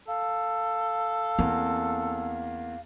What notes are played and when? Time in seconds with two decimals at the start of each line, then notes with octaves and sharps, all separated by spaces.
0.08 A4 F5
1.39 E2 A#3 C4